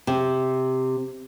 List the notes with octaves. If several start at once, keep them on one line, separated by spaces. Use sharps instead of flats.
C3